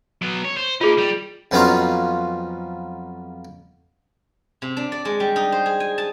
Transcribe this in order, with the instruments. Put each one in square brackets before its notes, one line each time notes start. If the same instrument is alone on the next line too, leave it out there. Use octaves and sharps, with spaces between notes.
[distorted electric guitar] F#3 B3
C#5
C5
[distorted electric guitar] A#3 D#4 [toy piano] F4 G#4
[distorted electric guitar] G3
[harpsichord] F2 F#3 B3 C#4 D#4 F4
[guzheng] C3
D4
D5
G#3
G3
D#4
C5
G#4
G#5
A5